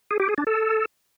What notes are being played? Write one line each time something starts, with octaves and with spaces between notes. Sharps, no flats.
G#4
G4
G#4
D4
A4